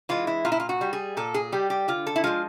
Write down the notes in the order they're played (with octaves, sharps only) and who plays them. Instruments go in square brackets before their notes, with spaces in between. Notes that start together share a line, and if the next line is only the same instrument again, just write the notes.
[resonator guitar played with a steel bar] E3 G#3 F4
E4
A#2 F4
E4
F4
F#4
G3
G#4
A#2 A4
G#4
G3 G4
G4
D3 F4
A4
E4
F3 G#3 F4